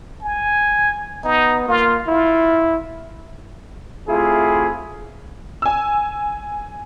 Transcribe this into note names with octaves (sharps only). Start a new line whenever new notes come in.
G#5
B3 D#4
A#3 F4
E4 F4
C3 A3 E4 F4 G#4
G#5 E6